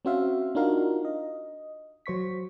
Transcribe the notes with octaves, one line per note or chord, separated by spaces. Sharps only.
C4 C#4 F#4 C5 E5 F5
D4 D#4 F4 F#4 A#4 F5
D#5
F#3 C5 C#6 B6